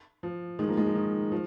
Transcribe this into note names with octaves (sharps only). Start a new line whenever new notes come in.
F3
D#3 G#3
F3 A#3
D#3 G#3
F3
D#3
F3